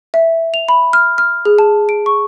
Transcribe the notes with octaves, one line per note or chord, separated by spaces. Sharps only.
E5
F7
B5
F6
F6
G#4
A5
D7
C#6